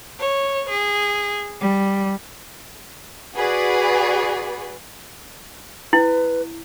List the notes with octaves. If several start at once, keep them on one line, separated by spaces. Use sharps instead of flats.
C#5
G#4
G3
F#4 G#4 B4 D5
E4 B4